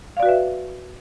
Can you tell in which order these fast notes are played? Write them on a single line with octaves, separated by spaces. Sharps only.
F5 D5 F#4 B4 E5